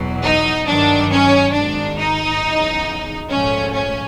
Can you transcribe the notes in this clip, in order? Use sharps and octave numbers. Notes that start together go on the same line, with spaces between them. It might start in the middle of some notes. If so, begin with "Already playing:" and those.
Already playing: E2 B2 F#3
D#4
G2 D#3 F#3 D4
C#4
G#1 G#2 D#3 D4
D#4
E2 C#3 F#3
A#1 G#2 F3 A3 C#4
C#4